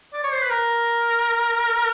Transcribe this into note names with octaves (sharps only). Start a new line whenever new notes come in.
D5
C#5
C5
B4
A#4